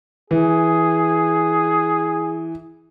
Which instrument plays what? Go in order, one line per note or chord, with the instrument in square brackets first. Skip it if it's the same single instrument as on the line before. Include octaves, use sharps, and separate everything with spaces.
[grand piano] E3 [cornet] G#4